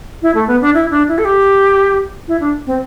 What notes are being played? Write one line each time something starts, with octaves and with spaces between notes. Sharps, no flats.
E4
A3
B3
D4
E4
D4
E4
A4
G4
E4
D4
C4